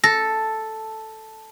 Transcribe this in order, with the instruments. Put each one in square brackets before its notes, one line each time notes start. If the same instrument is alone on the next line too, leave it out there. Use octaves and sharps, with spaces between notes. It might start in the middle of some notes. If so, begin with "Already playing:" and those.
[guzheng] A4 [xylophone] A#6